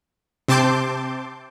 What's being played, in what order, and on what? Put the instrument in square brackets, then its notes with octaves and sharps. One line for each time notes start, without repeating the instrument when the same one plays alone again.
[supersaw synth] C3 C4 A5 C6 D6 G6